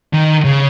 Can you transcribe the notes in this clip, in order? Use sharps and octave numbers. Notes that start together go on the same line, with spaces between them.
D#3
C#3